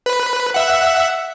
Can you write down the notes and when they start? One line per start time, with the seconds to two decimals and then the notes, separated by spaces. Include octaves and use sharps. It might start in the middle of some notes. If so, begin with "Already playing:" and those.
0.06 B4
0.54 E5 F#5